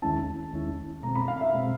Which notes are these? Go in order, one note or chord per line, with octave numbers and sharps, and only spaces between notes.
D#2 D#3 G#3 C#4 E4 A5
D#2 D#3 G#3 C#4 E4
B2 G#3 C4 A#5
B5
F5
E5
B2 G#3 C4